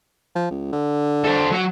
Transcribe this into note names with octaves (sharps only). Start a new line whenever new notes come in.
F3
C#2
D3
A4 C5
F#3 F#5